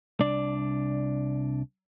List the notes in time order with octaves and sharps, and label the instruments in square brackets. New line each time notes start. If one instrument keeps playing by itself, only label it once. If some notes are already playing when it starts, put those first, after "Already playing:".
[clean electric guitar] C2 D4 D5